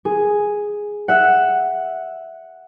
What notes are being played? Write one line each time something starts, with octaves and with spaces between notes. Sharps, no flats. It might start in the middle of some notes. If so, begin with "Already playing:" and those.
G#4
E5 F#5